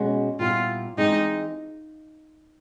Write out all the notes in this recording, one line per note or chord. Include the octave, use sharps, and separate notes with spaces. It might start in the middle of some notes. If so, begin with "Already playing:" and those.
Already playing: B2 G#3 C#4 F#4
A#2 G3 B3 E4 F4
E3 G#3 C4 D#4